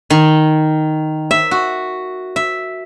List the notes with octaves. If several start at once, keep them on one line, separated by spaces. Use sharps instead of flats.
D#3
E5
F#4
E5